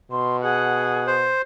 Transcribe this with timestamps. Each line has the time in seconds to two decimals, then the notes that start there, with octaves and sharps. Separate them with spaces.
0.11 B2 C6
0.43 G#4 F#5
1.07 C5